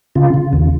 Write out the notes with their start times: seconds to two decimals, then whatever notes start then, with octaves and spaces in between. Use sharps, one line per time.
0.15 C#3 F4
0.34 C#3
0.53 D#2